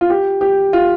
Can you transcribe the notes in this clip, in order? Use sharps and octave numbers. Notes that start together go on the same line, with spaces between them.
F4
G4
G4
F4